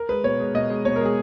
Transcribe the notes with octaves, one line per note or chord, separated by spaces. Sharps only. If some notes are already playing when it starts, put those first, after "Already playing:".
Already playing: A#4
G#3 B4
B2 C#5
G#3
B2 D#5
G#3
B2 C#5
A#4
G#3 G#4